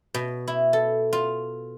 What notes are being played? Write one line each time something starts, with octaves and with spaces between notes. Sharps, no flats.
B2
E4
A4
F4